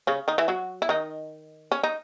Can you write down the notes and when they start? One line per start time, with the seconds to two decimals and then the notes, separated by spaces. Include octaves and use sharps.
0.07 C#3 C#4
0.28 D#3 D#4
0.38 E3 E4
0.48 F#3 F#4
0.82 E4
0.89 D#3 D#4
1.72 C#4
1.83 D#4